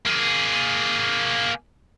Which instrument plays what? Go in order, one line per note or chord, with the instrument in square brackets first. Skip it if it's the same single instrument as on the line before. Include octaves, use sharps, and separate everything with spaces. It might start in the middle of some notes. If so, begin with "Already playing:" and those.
[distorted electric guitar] A#3 G#4